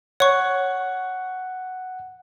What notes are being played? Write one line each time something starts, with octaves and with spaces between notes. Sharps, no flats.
C#5 F#5 C#6